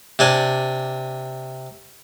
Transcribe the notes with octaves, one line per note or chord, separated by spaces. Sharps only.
C3 D4 G#5